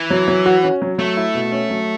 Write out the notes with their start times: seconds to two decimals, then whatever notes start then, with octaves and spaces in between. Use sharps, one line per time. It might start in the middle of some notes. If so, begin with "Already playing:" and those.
Already playing: E3
0.10 F#3
0.28 F#3
0.46 F#4
0.64 C#4
0.82 F#3
0.98 F#3 A3
1.17 E4
1.34 B2
1.52 C#4
1.70 F#3